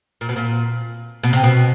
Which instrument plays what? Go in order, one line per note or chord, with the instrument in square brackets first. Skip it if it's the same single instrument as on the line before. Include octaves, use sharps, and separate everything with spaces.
[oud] A#2
B2
A#2
B2
C3
B2